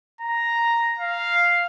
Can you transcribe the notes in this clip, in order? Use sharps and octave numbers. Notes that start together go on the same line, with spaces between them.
A#5
F5